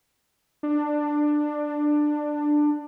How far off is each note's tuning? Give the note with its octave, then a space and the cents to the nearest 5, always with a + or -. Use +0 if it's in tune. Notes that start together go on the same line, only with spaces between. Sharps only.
D4 +15